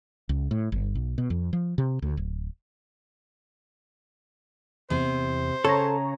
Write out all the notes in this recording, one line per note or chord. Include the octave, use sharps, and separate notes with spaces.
C#2
A2
G1
B1
B2
F2
F3
C3
D2
D1
E2 C3 C5
C#3 A4 C#5 A#5